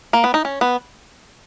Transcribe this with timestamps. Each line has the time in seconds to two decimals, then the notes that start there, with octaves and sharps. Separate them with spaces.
0.13 A#3
0.24 B3
0.34 D#4
0.45 C#4
0.61 B3